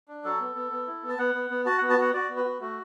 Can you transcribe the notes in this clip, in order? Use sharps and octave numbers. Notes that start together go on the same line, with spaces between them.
D4
F#3 A4
B3
B3
B3
E4
B3
A5
B3 F#5
B3
B3
F#4 A5
B3 F#5
A5
F#4 F#5
F#4 D5
B3
B4
F#4
A3 F#4